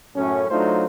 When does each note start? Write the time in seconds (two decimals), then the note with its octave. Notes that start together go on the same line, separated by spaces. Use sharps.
0.15 F#2 A2 C#4
0.50 F#3 A3 D4 D#4 F4 C5